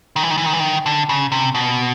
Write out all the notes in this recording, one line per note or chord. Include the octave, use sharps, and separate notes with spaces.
D#3
E3
D#3
E3
D#3
E3
D#3
D3
C#3
C3
B2